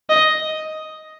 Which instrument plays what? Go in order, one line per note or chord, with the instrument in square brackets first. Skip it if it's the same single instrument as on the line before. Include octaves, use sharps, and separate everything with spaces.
[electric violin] D#5